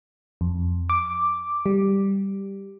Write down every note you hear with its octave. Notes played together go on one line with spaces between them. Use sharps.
F2
D6
G3